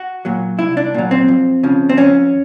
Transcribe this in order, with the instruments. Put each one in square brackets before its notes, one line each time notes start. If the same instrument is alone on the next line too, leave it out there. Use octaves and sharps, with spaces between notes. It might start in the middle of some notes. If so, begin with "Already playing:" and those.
Already playing: [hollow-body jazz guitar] F#4
A#2 F#3
C2 E4
D4
A#2 F#3
C4
F2
C#3 F3
C4
F2 C#4